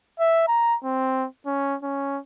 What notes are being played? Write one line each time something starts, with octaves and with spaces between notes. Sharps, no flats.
E5
A#5
C4
C#4
C#4